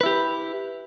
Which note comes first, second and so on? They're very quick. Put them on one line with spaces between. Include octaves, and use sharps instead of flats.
B4 E4 G4